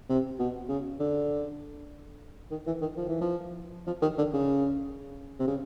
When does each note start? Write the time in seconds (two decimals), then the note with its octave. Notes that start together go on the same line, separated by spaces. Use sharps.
0.09 C3
0.39 B2
0.69 C#3
1.00 D3
2.51 D#3
2.67 E3
2.81 D#3
2.97 F3
3.08 E3
3.21 F3
3.87 F3
4.02 D#3
4.18 D3
4.33 C#3
5.39 C3
5.47 C#3